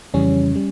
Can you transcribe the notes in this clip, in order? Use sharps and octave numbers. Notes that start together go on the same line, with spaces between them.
F2 C#3 E3 G3 C#4
G3